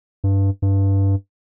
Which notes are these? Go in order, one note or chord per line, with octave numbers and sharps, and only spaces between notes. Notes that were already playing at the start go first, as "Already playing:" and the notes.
G2
G2